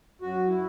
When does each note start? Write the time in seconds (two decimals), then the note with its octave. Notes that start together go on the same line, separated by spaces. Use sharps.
0.22 F#2 F#4
0.48 E4